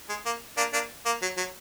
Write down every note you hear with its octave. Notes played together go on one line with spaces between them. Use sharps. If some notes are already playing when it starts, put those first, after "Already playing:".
G#3
A#3
A#3 D4
A#3 D4
A#3
F#3
F#3